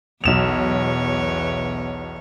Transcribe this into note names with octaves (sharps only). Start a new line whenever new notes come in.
B1 E2 C#5 E7 F7